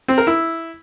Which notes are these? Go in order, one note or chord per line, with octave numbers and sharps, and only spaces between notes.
C4
A#4
E4